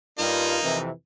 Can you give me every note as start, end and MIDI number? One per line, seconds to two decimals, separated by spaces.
0.19 0.57 43
0.19 0.78 58
0.19 0.78 63
0.19 0.57 65
0.63 0.89 41
0.63 0.89 48
0.63 0.89 52